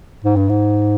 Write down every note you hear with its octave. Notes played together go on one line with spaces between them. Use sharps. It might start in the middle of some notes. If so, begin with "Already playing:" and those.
G#2
G2
G#2